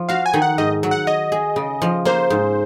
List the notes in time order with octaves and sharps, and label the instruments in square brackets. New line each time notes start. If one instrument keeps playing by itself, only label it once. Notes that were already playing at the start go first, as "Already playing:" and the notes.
Already playing: [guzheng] F3
[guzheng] F#4 [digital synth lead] F5
[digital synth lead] G#5
[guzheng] D#3
[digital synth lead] F#5
[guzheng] G#2 [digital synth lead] D#5
[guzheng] F#3
[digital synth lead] F#5
[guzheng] C#5 [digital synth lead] D#5
[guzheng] G#4
C#3
F3
[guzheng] A#3 [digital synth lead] C5
[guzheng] G#2